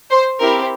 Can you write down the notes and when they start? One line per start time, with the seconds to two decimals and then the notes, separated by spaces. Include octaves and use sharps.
0.10 C5
0.40 C4 E4 G4 A#4